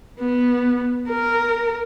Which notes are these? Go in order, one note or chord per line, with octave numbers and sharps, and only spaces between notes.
B3
A#4